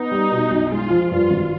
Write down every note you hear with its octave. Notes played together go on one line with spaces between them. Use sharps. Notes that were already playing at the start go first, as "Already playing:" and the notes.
Already playing: B3 D#4
G3
B2
B1
G#3 F4
F3
G2 F4
G#1